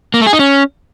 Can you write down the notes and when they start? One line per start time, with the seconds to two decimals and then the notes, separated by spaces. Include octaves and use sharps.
0.14 A#3
0.20 A3
0.27 G#4
0.33 D#4
0.39 C#4